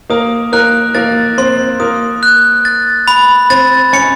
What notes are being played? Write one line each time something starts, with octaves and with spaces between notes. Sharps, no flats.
A#3 A#4 D#6
A#3 A#4 F#6
A#3 A#4 A6
C4 C5 C6
A#3 A#4 D#6
F#6
A6
B5
C4 C5 A6
C#4 C#5 C#7